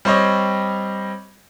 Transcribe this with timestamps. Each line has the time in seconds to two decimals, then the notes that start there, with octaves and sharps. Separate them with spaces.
0.05 G3 C4 C5 C#5 D#5